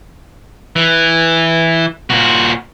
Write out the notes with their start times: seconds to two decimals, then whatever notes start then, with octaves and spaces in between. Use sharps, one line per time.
0.76 E3
2.10 A#2 F#4